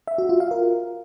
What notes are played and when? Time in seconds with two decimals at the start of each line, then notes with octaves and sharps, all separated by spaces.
0.08 E5
0.18 F#4
0.29 F4
0.40 F5
0.51 A#4